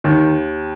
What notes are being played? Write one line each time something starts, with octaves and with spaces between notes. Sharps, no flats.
D#2 D#3